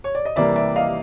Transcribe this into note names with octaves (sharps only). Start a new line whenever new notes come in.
C#5
D5
D#5
C3 E3 G3 A#3 D5 E5
D5 E5
D#5 F5